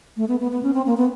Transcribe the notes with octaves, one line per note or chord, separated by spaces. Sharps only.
A3
B3
B3
B3
C#4
C4
A#3
B3